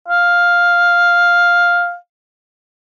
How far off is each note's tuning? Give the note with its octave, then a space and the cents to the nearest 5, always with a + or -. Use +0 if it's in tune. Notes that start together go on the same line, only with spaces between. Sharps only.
F5 +5